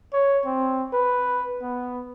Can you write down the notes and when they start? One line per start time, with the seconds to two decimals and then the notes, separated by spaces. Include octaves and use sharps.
0.13 C#5
0.45 C4
0.93 B4
1.62 B3